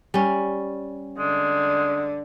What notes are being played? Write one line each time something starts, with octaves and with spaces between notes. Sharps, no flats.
G3 C#4
D3 G#3